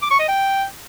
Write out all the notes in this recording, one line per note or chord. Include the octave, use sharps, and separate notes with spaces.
D6
C#6
D#5
G5